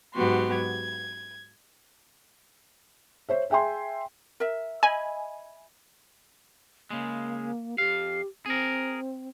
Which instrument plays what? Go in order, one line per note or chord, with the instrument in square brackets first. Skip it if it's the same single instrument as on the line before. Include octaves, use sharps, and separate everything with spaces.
[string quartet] G#2 F#3 B3 F#4 G4 C6
G#6
[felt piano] C5 C#5 E5
G#4 E5 G5 G#5 C6
[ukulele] A#4 E5
[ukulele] D#5 E5 B5 [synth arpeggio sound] G#5
[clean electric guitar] C#3 G#3 [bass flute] A#3
[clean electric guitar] F2 F5 [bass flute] G4
[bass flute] C4 [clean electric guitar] G#4 A#4